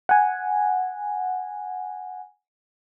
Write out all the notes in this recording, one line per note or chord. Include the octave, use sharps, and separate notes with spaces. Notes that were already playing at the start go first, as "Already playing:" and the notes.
F#5 G#5